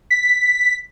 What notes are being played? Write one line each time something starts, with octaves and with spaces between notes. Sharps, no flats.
B6